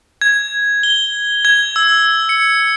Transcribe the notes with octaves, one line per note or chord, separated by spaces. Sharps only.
G#6
G7
G#6
E6
C#7